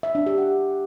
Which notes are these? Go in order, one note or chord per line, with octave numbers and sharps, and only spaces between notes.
E5
D4
G4
F#5